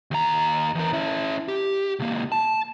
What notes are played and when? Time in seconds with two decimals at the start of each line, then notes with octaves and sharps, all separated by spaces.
0.11 D#2 A#5
0.75 E2 A#4
0.93 C#4 E4
1.48 G4
1.99 C#2 A#3
2.32 A5